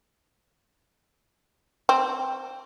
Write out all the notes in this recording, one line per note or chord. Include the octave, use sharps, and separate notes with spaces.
C4